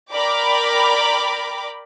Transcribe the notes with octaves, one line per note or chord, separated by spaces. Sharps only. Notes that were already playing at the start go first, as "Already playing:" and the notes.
A#4 D5 G5 B5 D6